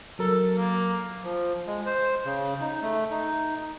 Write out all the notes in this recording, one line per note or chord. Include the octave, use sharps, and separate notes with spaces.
F#3 A4 A#4
A#3
F3
G#3
C5
C#3
D#4
A3
D#4